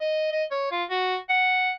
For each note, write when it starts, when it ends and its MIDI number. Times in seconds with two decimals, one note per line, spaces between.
0.01 0.27 75
0.32 0.44 75
0.51 0.70 73
0.72 0.84 65
0.90 1.17 66
1.29 1.71 78